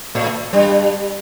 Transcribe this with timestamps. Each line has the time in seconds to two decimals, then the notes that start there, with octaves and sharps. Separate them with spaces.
0.15 A2 A3
0.53 G2 G3